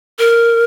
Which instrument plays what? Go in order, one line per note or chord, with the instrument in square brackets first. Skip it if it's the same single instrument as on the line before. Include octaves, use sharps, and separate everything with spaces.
[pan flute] A#4